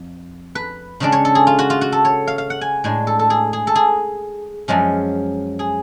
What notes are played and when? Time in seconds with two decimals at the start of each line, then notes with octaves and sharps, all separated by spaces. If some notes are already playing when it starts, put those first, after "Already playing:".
Already playing: F2
0.55 B4
1.00 C#3 G#3 D4 D5
1.12 C#5
1.25 A4
1.35 G#4
1.47 F4
1.59 F#4
1.70 F4
1.81 F#4
1.92 A4
2.05 C#5
2.27 F5
2.38 F5
2.50 F#5
2.61 G#5
2.84 A2 G#3 D4 G#5
3.07 A4
3.19 A4
3.30 G#4
3.53 G#4
3.67 A4
3.75 G#4
4.68 F#2 F3 G#3 C#4
5.59 G#4